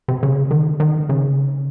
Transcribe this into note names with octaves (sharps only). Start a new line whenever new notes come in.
C3
C#3
D#3
D#3
C#3